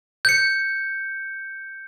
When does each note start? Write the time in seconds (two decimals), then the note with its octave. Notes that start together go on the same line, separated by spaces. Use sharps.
0.25 G6 C#7